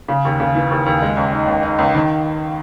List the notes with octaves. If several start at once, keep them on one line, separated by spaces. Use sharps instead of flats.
C#3
D#2
C#3
E3
D#2
D#2
G#3
C#2
D#4
C#2
D#4
C#2
D#3